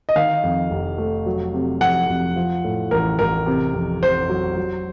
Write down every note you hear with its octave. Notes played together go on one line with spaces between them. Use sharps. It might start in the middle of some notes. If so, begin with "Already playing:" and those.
D#5
D#3 F5
F2
F1
A3
F#3
C3
F2 F#5
F2
F3
A2
A1 A#4
A1 A#4
C3
F2
F1 C5
F#3
F#3